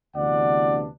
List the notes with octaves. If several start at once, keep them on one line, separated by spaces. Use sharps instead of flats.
D2 C3 E3 B3 D4 D5 F#5